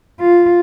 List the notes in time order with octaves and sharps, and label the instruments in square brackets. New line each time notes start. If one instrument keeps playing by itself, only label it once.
[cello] F4